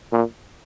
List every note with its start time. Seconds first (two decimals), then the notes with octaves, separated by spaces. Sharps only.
0.12 A#2